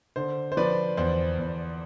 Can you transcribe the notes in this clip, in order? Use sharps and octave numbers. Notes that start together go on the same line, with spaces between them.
D3 C5
C5
F3 B4 D5
E2 C5
E2